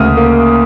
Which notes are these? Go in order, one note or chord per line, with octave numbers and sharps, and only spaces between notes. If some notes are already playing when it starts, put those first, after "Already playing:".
Already playing: D2 C#3 A#3 D#6 F6
A#3